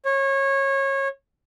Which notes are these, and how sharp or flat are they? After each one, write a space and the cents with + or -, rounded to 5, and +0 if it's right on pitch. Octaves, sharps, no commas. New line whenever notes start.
C#5 -25